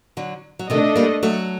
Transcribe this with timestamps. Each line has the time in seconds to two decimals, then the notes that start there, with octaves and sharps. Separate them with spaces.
0.17 D3 F#3
0.59 F#3
0.70 C3 D#3 A3 D4 A4 D#5
0.96 G3 A#3
1.23 F#3 A3